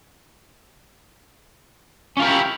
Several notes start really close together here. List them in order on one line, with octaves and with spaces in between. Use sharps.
C#4 F4 A#4 G4 E4